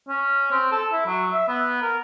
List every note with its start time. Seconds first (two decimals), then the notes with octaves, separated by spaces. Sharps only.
0.08 C#4
0.51 C4
0.72 A4
0.92 E4
1.06 F#3
1.32 E5
1.48 B3
1.82 A#4